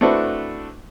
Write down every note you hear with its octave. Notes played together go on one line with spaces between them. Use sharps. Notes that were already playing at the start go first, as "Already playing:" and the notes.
A3 C4 D4 E4 F#4 B4